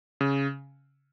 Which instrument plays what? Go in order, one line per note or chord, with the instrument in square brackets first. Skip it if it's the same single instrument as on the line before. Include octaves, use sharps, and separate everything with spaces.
[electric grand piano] C#3